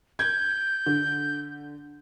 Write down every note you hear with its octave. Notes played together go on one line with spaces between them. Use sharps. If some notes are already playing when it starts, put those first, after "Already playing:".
G6 G#6
D3